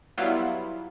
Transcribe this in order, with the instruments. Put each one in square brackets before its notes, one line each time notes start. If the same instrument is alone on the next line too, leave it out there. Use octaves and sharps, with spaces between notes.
[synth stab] F#3 G3 B3 E4 F4